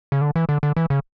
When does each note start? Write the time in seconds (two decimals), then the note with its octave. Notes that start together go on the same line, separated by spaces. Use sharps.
0.12 C#3
0.21 D3
0.36 E3
0.49 D3
0.63 D3
0.77 E3
0.90 C#3